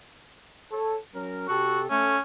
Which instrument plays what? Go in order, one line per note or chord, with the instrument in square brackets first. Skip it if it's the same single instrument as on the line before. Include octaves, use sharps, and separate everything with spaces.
[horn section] A4 C#5
F#3 C#4 A#4
[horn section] C3 G4 A4 [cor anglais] F#4
[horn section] A3 [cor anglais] C#4